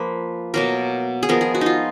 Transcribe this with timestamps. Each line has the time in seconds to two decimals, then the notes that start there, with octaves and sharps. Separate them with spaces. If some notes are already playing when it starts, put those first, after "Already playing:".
Already playing: F3 A#3 B4
0.54 B2 F#3 A#3 A#4
1.23 G#4
1.29 F3 G#3 B3 A#4
1.41 G#4
1.55 F#4
1.61 D#4 F4